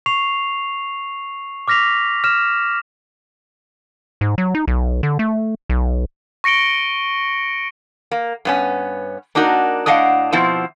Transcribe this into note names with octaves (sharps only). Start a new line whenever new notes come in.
C#6 C7 F7
D6 F6 A#6 B6 F7
F6 E7
G#2
F#3
D#4
B1
D3
A3
B1
C#6 A#6 C#7 D7 G7
A#3
G2 B3 C#4
A#3 D4 D#4 F#4 A#4
A2 D4 D#5 F5 F#5
B2 F3 B3 C4 E4